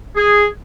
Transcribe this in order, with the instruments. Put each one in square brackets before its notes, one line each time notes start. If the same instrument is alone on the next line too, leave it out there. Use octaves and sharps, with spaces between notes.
[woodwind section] G#4